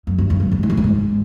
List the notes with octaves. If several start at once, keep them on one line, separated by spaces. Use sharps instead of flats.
F#2
G2
F2
F#2
G2
A2
G#2
G2
G#2